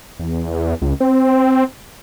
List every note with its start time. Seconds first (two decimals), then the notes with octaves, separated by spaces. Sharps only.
0.20 E2
0.82 C#2
1.00 C4